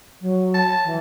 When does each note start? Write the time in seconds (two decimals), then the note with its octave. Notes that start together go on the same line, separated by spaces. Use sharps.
0.21 F#3
0.54 A5
0.84 E3